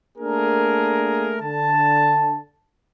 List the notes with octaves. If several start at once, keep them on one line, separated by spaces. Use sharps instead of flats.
A3 A#3 D4 G#4 A#4
D3 A5